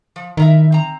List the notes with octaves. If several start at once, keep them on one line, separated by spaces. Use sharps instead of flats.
F3
D#3 E4 A#4 E5
C4 A#5